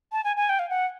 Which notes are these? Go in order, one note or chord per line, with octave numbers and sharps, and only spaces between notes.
A5
G#5
G#5
G5
F5
F#5